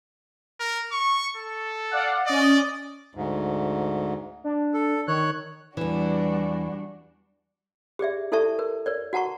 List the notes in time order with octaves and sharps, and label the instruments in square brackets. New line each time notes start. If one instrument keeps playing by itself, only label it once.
[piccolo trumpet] A#4
C#6
A4
[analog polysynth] D5 F5 F#5
[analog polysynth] C#4 D#5 [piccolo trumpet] D5
[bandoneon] D2 G#2
[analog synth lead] D4
[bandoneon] A4
[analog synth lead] D#3 [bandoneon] C#5 F#6
[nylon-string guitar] E2 E3 [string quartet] G3 D4 F#4
[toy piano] G4 G#4 D5 E5
E4 A4 D5 E5 A5 C#6
A#4
A#4 C#5 D5
F#4 F#5 A5 A#5 C#6